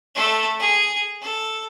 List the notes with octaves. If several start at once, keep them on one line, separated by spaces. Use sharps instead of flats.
A3 A4
G#4
A4